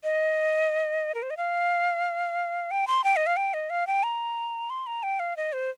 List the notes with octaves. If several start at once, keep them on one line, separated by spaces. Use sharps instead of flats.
D#5
A#4
C5
D#5
F5
G5
C6
G5
D#5
F5
G5
D#5
F5
G5
A#5
C6
A#5
G5
F5
D#5
C5